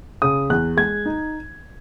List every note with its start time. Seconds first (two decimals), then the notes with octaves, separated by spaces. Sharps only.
0.22 C#3 D#6
0.50 E2 F#6
0.77 G#3 G#6
1.06 D#4